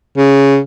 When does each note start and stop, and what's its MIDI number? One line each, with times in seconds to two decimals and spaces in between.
0.17 0.58 49